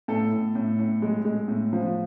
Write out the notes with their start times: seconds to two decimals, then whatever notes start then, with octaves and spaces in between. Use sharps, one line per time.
0.08 A2 A4
0.32 A2
0.55 A2
0.79 A2
1.02 G#3
1.25 G#3
1.48 A2
1.73 F3